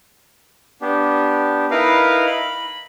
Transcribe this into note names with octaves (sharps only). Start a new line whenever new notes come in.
B3 D4 G4
D#4 E4 A#4 B4 F5
B5